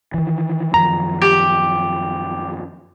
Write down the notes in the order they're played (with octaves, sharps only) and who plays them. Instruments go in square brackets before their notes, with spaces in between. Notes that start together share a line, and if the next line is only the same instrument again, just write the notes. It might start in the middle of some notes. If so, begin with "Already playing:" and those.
[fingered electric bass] D#3 E3
[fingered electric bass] F#2 D#3 F3 [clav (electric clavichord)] A#5
[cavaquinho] G4